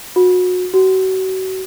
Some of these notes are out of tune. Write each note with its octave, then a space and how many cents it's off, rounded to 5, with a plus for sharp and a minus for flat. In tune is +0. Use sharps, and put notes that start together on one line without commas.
F#4 -30
F#4 +35